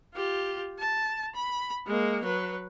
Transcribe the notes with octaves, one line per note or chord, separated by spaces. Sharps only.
F4 G4
A5
B5
G#3 A#3
F#3 B4